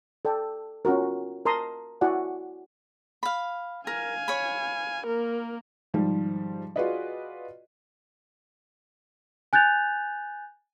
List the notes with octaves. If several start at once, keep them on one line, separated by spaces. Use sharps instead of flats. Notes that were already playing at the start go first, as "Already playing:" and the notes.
A4 D5 G5
C#4 F4 F#4 A#4
A#4 A5 A#5 C6 D#6
E4 F#4 D5 F#5 G#5
F5 B5
A#4 F5 G#5
C#5 B5
A#3 A#4
G#2 D#3 F3 G3
F4 F#4 G#4 B4 D5 D#5
G#5 F#6 G6 A6 F7